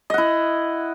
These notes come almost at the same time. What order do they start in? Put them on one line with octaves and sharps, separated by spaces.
D#5 F#5 E4